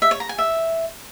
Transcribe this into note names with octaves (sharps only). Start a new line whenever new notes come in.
E5
C#5
A#5
G#5
E5